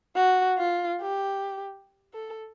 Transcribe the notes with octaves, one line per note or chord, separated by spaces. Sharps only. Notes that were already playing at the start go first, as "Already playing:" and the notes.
F#4
F4
G4
A4